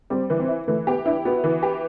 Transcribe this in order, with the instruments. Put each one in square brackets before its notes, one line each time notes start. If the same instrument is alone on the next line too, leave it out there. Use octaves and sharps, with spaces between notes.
[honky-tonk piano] G3 [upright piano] C4
[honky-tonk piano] E3
[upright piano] C4
[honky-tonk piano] E4
[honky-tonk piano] E3 [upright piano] A3
[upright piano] B3 [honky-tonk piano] G4
[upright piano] D4 [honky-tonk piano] E4
[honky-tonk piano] B3 [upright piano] F#4
[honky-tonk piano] E3
G4